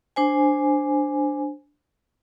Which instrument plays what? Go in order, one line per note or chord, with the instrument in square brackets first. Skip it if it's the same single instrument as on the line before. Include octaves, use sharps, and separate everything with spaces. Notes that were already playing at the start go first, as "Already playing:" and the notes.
[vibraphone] D4 C5 G#5